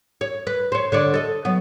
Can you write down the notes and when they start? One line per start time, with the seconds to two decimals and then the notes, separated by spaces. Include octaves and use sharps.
0.21 C#5
0.47 B4
0.72 C5 C#5
0.92 D3 C#5 D5
1.14 A4 D#5
1.45 F#3 B3